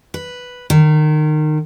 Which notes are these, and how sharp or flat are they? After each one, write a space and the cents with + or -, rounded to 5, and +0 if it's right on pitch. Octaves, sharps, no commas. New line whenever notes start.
B4 +0
D#3 -25